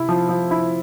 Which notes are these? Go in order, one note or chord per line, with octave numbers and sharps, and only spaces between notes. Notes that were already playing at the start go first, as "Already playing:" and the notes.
Already playing: C3 E4
F3
F3
E4